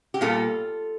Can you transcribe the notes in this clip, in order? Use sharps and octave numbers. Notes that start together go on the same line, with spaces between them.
G4
A#2 G3 A#3 F4 A4